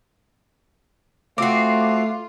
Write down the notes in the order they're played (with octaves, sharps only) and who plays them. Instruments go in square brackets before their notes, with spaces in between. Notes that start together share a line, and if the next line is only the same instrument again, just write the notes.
[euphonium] A3 [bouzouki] C4 F#4 [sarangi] F4 [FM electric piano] D6 C7